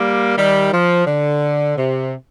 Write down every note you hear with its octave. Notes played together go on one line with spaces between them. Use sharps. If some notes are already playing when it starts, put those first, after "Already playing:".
Already playing: G3 A#3
D#3 G3
F3
D3
C3